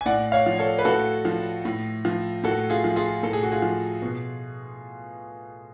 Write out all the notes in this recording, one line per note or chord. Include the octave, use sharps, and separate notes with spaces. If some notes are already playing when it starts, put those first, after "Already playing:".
G#5
A2 D5 F#5
C#5 F5
F3
A4 C#5
B4
A2 F#4 A4
F3
A2
F3
A2 F#4 A4
F4 G#4
F3
F4 G#4
A2 A4
G#4
F#4
F4 G#4
F3
B2